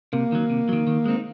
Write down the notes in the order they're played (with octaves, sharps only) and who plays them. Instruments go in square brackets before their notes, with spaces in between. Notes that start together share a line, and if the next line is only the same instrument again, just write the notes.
[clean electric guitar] C3 [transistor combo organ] A#3
[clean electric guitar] D#3 F#3
C3
D#3 F#3
D#3
G#3 C4 D#4